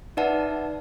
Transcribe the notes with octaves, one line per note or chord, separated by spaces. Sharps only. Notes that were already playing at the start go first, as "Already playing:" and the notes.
D#4 B4 D5 E5 F#5 A5